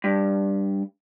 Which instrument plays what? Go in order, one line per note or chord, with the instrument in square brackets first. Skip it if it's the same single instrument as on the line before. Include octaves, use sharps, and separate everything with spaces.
[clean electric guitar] G2